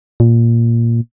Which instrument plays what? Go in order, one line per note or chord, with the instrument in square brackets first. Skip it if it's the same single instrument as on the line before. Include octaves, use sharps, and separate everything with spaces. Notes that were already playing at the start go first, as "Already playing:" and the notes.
[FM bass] A#2